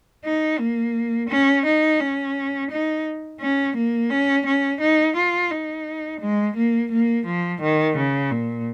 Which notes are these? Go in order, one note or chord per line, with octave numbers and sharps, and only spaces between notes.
D#4
A#3
C#4
D#4
C#4
D#4
C#4
A#3
C#4
C#4
D#4
F4
D#4
G#3
A#3
A#3
F3
D#3
C#3
A#2